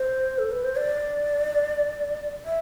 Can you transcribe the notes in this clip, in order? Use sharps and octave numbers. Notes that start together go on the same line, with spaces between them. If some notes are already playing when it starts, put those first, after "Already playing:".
Already playing: C5
A4
B4
C5
D5
E5